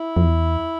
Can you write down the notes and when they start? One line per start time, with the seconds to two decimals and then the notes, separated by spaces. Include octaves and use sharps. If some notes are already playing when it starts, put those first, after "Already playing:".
Already playing: E4
0.17 F2
0.24 E2